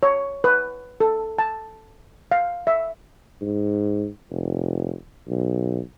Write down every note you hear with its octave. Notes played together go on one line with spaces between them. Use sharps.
C#5
B4
A4
A5
F5
E5
G#2
F1
B1